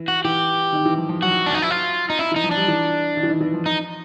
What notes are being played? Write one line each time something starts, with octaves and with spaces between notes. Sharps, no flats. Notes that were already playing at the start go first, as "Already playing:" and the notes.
Already playing: E3
F#4
E3 G4
D#3
E3
F3
F3
F#3 F#4
D4
D#4
E4
F4
D#4
E4
E3 D#4
F3
D4
G3
E3
D#3
E3
D#3
E3
F3
D#4